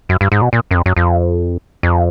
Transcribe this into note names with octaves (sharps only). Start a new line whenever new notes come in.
F#2
G2
G#2
B2
A#2
F#2
F2
F#2
F2
F2